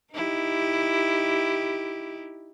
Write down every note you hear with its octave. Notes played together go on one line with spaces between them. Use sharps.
D#4 E4 G4